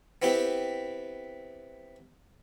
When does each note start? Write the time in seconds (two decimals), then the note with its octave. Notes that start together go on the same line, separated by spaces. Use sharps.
0.22 B3 C4 E4 G4 B4